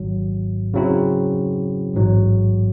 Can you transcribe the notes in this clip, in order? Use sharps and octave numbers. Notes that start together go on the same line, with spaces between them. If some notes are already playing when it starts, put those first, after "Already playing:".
Already playing: G#1 G#2 F#3
C#3 F#3 C4 E4
A1 G#2 F#3